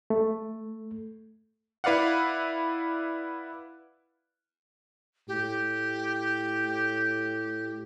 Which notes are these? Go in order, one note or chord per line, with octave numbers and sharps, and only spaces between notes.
A3
E4 B4 D5 F5 F#5
A2 G4